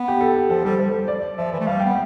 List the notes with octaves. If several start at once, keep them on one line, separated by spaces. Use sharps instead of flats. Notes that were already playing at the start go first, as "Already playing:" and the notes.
Already playing: B3
G4
A4
F3 A4
G3 A4
C5
D5
F3 E5
E3
A3
G3 F5
G5
B3